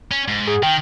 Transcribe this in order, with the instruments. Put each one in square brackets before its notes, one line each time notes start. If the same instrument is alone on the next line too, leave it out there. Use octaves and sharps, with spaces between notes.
[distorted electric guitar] C#4
G#2
[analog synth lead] G#4
[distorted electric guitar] D#3 [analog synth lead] G5